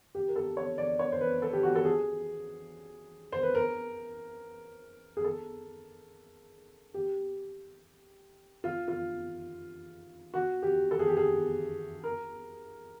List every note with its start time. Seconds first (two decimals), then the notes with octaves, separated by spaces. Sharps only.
0.15 G4
0.28 A#4
0.36 A4
0.57 C#5
0.78 D5
0.99 C#5
1.12 C5
1.21 B4
1.42 A4
1.53 G4
1.63 F#4
1.75 A4
1.85 G#4
3.32 C5
3.43 B4
3.55 A#4
5.17 G#4
5.24 A4
6.94 G4
8.64 F4
8.88 F4
10.34 F#4
10.63 G4
10.91 A4
10.99 G#4
11.08 G4
11.17 G#4
12.04 A#4